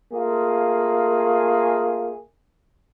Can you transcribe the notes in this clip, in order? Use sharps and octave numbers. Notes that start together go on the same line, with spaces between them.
A3 A#3 F4 G#4